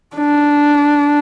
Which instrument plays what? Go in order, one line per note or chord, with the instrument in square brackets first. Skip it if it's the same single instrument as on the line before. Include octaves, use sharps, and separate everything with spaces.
[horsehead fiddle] D4